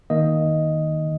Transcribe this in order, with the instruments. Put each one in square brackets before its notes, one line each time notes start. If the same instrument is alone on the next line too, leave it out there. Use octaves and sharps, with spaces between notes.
[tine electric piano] D#3 A#3 D#5